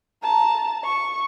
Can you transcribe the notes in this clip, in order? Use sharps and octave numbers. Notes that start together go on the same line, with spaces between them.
A5 A#5
C#6